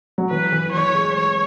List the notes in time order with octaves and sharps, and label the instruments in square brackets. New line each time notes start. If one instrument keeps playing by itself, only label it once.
[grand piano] F#3
[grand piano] E3 [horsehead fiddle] B4
[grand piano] E3
[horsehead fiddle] C#5
[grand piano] G#3
[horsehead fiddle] C#5